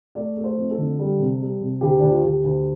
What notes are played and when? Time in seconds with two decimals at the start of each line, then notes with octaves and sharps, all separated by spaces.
0.15 A3 D5
0.36 A3
0.44 C5
0.57 F2
0.70 A4
0.78 D3
0.99 G3
1.19 C3
1.41 G3
1.61 C3
1.81 D2 G4
1.99 D2 D4
2.10 F4
2.23 D2 G4
2.44 D2